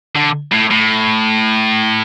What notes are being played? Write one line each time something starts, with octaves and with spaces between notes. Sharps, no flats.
D3
A2
A2